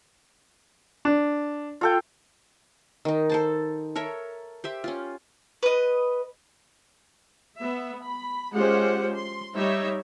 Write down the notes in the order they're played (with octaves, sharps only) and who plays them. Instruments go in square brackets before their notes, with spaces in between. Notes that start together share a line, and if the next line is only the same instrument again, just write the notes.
[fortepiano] D4
[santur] F4 A4 G5
[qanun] D#3 D#4
A4 C5 A5
A4 A#4 C#5 E5
G4 C5 E5
C#4 F4
[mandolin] B4 D#5
[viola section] B3 E5
B5
G#3 C#4 F4 G4 C5 F#5
C6
G3 D#4 C#5 E5